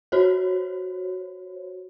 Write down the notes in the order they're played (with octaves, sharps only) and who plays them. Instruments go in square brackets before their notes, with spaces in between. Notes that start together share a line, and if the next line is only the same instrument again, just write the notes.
[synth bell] F#4 C5 C#5